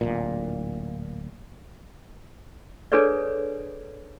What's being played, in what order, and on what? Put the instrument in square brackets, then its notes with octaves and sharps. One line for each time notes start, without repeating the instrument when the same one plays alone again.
[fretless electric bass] D1 G1 A#2
[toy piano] D4 G#4 A4 B4 C#5 D5